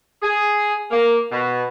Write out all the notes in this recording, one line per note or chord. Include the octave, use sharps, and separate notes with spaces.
G#4
A#3
B2